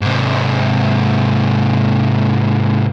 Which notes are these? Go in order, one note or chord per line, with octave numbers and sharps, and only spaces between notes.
G#2 C3